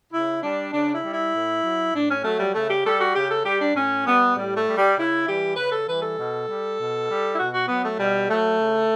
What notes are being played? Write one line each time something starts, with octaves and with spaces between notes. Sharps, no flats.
C#3 E4
G3 D4
C#3 D4
E4
G3
E4
A2
F#3
A2 D4
C#4
F#3 A3
G3
C#3 A3
G4
G3 A4
F#4
C#3 G4
A4
G3 G4
D4
A2 C#4
G3 B3
A2 G3
A3
G3
G3
C#3 E4
E3 G3 G4
C#3 B4
A4
E3 G3 B4
A4
B2
G3
B2
G3
E4
B2 F#4
F#4
F#3 B3
A3
B2 G3
F#3 A3
C#3